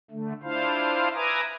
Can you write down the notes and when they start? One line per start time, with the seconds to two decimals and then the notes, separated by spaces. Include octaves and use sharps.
0.11 D3 A3
0.43 D4 E4 F4 C5 F5
1.14 B4 E5 G#5 A#5 D6 D#6